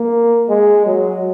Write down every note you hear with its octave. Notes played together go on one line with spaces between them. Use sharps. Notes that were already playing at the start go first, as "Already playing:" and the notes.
Already playing: A#3
G#3
F#3